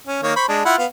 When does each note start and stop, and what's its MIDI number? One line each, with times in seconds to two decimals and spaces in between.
0.07 0.20 61
0.23 0.35 51
0.23 0.35 58
0.23 0.35 73
0.36 0.45 72
0.36 0.45 83
0.36 0.45 85
0.48 0.64 56
0.48 0.64 62
0.65 0.77 64
0.65 0.77 65
0.65 0.77 78
0.78 0.86 59
0.78 0.86 77